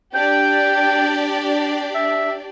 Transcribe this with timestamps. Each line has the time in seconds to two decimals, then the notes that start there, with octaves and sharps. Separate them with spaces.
0.15 D4 G4 D5 G5
1.95 E5